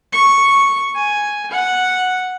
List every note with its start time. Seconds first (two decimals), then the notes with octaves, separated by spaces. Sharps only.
0.12 C#6
0.95 G#5
1.51 F#5